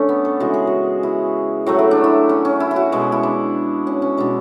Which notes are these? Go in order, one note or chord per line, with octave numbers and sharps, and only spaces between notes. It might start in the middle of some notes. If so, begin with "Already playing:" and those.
Already playing: D3 A3 C#4
B3
A4
C#3 E3 G#3 F#4
G#4
F#4
E4
A2 F#3 A3 F#4
E4
D4
E4
C#4
C#4
E4
E4
F#4
B2 G#3
E4
D4
C#4
C#4
B2 G#3 D4